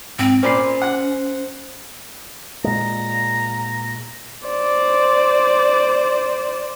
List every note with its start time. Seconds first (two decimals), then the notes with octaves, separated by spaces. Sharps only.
0.19 G#2 C4
0.43 A#2 C#4 C5 D5 B5 C7
0.82 F#5 F#6
2.64 A#2 G#3 A#5
4.48 C5 D5